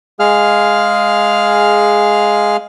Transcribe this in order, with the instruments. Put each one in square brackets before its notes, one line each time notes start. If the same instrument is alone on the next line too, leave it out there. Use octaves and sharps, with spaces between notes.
[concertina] G#3 G#4 F5 F6